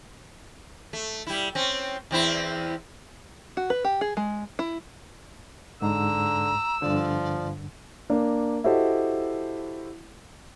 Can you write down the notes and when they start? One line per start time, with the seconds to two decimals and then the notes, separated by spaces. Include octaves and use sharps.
0.93 A3
1.27 G3 E4
1.55 C4 C#4
2.11 E2 C4 E4
3.57 F#4
3.70 B4
3.85 G4
4.01 G#4
4.17 G#3
4.59 E4
5.82 G#2 D3 A#5 E6
6.82 G2 D3 F3 D5
8.10 A#3 D4
8.64 E4 F#4 G4 A4 C5 D#5